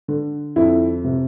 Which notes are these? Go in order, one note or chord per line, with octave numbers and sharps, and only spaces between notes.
D3
F2 E4
C3